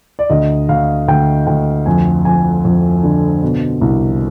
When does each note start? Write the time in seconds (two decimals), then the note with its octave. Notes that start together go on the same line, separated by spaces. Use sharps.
0.19 D5
0.30 D2 D#5
0.69 D2 F5
1.08 D2 G5
1.47 D2 G5
1.86 F2 G#5
2.25 F2 G#5
2.65 F2
3.03 D3
3.42 B2
3.81 C2